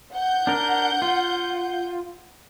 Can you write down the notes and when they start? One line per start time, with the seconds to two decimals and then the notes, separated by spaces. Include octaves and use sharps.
0.14 F#5 G6
0.47 D4 A#4
1.02 F4